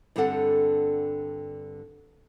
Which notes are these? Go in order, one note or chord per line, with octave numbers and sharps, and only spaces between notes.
G2 D3 G3 C4 A4 F#5